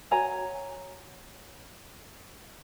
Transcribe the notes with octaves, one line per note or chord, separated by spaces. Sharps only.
F#4 C#5 G#5 A#5